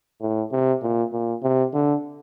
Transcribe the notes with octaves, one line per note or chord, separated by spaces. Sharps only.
A2
C3
A#2
A#2
C3
D3